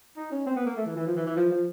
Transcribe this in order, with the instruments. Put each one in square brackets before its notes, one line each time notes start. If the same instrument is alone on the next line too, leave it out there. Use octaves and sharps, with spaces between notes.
[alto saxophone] D#4
C#4
C4
B3
A#3
A3
E3
E3
F3
E3
E3
F3
F3